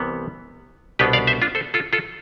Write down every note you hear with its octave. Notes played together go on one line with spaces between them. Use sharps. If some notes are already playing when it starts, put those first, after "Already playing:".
Already playing: C2 C3 E3 G3 B3
C2 B2 B3 D4 G4 B4
D5 F5
C5 E5
D4 F4
A4 C5
F4 A4
F4 A4